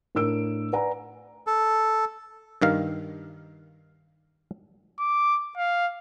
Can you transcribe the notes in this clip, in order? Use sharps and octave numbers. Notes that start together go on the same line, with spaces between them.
A2 D4 A#4 E6 D7
B4 D5 F#5 G#5 A#5
A4
G2 D#3 F5
D6
F5